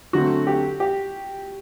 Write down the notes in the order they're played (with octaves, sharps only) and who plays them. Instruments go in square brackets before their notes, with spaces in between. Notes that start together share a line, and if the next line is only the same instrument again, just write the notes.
[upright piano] D3 F#3 A3 C4 [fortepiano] F#4
[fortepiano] G4
G4